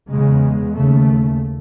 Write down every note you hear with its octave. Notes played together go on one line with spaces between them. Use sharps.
E2 C#3 G#3
D#2 C#3 A3